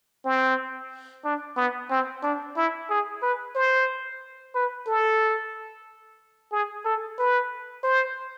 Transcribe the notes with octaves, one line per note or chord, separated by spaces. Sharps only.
C4
D4
B3
C4
D4
E4
G#4
B4
C5
B4
A4
G#4
A4
B4
C5